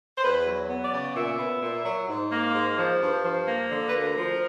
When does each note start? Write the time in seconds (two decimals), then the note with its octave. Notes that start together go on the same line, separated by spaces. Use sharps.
0.18 C5
0.24 E2 B4
0.47 F#3
0.69 B3
0.85 D5
0.93 C#3
1.16 A#2 E5
1.39 B3
1.62 A#2
1.85 F#3
2.09 G#2
2.32 A#3
2.55 G#2
2.78 F3
3.01 G2
3.25 F3
3.47 A#3
3.71 D3
3.89 B4
3.94 D2 A#4
4.17 F3